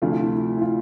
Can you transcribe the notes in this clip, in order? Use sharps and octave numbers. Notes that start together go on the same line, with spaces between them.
D2 C3 F3 A3 F4
E4
F4
E4
F4